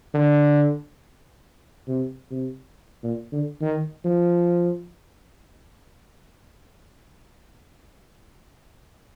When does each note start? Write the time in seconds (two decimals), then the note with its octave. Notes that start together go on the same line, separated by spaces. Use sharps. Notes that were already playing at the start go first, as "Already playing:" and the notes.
0.14 D3
1.88 C3
2.31 C3
3.03 A#2
3.32 D3
3.61 D#3
4.04 F3